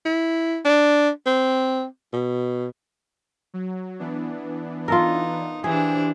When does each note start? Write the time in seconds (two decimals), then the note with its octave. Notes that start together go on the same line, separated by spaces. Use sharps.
0.05 E4
0.65 D4
1.26 C4
2.13 B2
3.54 F#3
3.99 E3 B3 D4
4.88 D#4 F4 A4 A#4
5.64 E3 D4 G4 G#4 C5